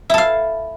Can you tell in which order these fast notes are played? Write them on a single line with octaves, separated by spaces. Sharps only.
E4 A4 F5